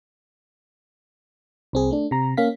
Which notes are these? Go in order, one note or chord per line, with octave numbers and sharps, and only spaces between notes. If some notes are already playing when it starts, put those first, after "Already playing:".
C2 C4 G#4
A3 D4
C3 A#5
A#3 C#4 F5 B6